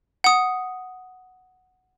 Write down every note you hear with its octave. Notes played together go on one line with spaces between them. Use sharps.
F#5 D#6